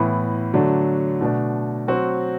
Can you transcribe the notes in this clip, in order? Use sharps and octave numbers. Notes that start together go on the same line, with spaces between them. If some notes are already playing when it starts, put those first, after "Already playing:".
Already playing: A2 E3 B3 E4
D3 F#3 A3 D4
B2 A3 D4
F#3 C4 F#4